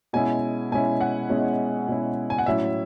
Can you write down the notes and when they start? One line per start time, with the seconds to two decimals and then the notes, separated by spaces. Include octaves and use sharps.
0.13 B2 G#3 C#4 E4 G#5
0.71 B2 G#3 C#4 E4 G#5
1.01 F#5
1.29 B2 G#3 C#4 E4
1.88 B2 G#3 C#4 E4
2.30 G#5
2.38 F#5
2.46 A2 F#3 C#4 E4 E5